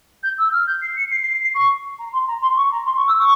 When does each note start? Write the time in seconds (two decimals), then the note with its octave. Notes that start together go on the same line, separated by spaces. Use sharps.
0.23 G6
0.38 E6
0.52 F6
0.67 G6
0.82 C7
0.96 C#7
1.11 C7
1.22 C7
1.33 C7
1.43 C7
1.54 C#6
1.98 A#5
2.12 C6
2.27 A#5
2.42 C6
2.56 C#6
2.71 A#5
2.86 C6
2.96 C#6
3.07 E6
3.18 C#6